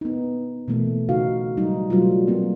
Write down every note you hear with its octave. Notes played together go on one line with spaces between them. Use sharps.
B3 D#4
B2 E3 A3 A#3
C#3 D#4 F#4 F5
F#3 G3 D#4
B2 F#3 G3 A3 F4
G#3 A#3 C4